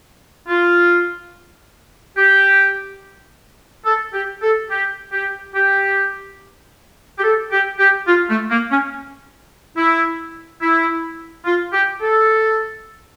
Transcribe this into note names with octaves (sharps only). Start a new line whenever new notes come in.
F4
G4
A4
G4
A4
G4
G4
G4
G4
A4
G4
G4
F4
A3
A#3
C#4
E4
E4
F4
G4
A4